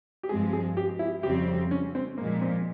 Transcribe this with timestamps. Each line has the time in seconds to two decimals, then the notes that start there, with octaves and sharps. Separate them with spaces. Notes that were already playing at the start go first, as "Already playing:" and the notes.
0.23 G4
0.29 G2 F3 G#3 C4 G#4
0.53 G#4
0.77 G4
0.99 E4
1.23 F2 C#3 G3 C4 G4
1.71 C#4
1.95 C4
2.18 A#2 F3 G#3 A#3
2.41 C4